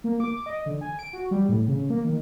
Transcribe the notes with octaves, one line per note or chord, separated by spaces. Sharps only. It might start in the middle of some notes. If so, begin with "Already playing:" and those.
A#3
D6
D#5
D3
G#5
D7
F#4
G3
A2
C#3
A#3
D#3